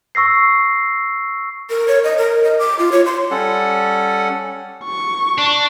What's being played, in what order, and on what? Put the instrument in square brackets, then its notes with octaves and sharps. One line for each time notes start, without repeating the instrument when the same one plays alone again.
[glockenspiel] C#6 E6 A#6 C7
[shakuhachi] A#4
C#5
D#5
A#4
D#5
D6
F4
C#5
C6
[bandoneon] G3 C#4 A4 F#5
[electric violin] C#6
[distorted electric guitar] D4